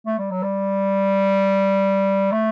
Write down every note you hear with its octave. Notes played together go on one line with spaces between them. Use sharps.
A3
G3
F#3
G3
A3